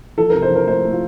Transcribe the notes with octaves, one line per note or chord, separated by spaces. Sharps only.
F3 A4
C3 A#4
C5
F3 A#4
A3 C5
A3
F4